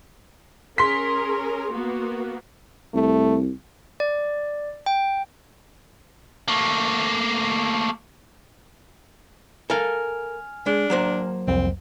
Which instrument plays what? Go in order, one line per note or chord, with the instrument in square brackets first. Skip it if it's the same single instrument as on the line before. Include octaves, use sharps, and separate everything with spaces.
[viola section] C#4 G#4 A#4 [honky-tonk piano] C6 B6
[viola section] A#3 B3 F#4
[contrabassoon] C2 [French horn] A3
[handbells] D5
G5
[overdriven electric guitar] A3 A#3
[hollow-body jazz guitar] A4 A#4 F5 [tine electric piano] G#5 F6
[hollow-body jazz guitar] G#3 [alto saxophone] D4
[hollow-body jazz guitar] F#3 A#3 C5
[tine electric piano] C2 F2 [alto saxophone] C4